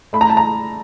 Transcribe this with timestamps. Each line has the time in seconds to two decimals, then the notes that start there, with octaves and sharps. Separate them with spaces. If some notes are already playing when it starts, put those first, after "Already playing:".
0.13 A3 B5
0.21 A#5
0.30 A5
0.37 A#5